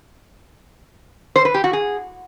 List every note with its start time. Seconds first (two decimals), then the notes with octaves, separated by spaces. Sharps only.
1.36 C5
1.45 B4
1.54 G4
1.64 F#4
1.73 G#4